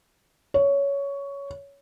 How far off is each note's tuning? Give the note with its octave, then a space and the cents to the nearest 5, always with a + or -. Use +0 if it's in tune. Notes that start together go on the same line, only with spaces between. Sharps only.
C#5 +15